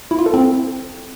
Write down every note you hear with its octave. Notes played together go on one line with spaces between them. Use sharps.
E4
F4
A4
C4